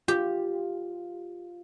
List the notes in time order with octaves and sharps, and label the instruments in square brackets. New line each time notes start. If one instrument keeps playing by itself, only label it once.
[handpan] F4 [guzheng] G4